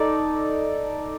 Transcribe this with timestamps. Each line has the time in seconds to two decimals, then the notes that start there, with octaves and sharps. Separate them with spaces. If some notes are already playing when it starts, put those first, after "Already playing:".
Already playing: D#4 A4 D5